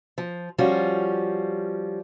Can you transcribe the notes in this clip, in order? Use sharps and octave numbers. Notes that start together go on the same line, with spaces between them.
F3
F3 G3 C#4 F4 F#4